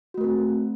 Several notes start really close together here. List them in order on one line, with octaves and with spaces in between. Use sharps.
F#4 A3 A#4 C4